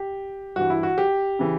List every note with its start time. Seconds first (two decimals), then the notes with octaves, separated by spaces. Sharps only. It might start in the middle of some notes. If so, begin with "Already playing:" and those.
Already playing: G4
0.56 G2 E3 F#4
0.70 E4
0.83 F#4
0.98 G4
1.39 C#3 E3